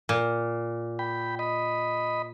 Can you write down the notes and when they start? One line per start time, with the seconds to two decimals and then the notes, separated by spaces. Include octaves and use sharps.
0.09 A#2
0.99 G5 B5
1.39 D#5 B5